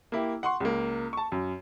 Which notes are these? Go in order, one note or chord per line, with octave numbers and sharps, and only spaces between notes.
A#3 E4 G4
F#5 C6 C#6
C#2 A#3
A5 C#6
F#2